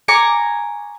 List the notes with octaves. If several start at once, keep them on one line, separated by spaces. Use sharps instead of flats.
G#5 A#5 C#6 D6